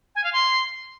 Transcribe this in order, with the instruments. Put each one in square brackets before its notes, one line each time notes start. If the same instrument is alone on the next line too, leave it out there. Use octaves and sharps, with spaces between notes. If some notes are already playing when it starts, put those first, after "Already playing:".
[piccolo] G#5
F5
C6